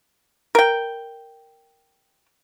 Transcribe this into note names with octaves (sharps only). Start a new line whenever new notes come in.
A#4 G5